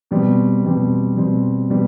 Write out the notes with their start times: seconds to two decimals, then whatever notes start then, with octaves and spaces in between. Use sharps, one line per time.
0.11 B2 G3 C4
0.63 B2 G3 C4
1.17 B2 G3 C4
1.70 B2 G3 C4